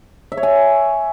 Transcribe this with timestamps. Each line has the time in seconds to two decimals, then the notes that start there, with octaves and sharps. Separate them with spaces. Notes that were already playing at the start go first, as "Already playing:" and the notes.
0.32 E5
0.37 C#5
0.43 G#5